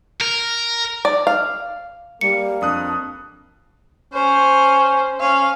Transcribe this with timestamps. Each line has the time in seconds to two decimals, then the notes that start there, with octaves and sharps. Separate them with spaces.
0.21 A#4
1.05 D5
1.27 F5
2.21 G3 A#3 C#7
2.62 F2 D4 D#6 F#6
4.14 C#4 C5
5.20 C#4 F5